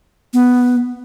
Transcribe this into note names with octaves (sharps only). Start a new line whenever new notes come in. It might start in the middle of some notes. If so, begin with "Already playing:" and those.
B3